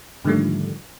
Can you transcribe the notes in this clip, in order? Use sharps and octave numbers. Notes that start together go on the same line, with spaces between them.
G#2 D3 D#3 F3 G3 A3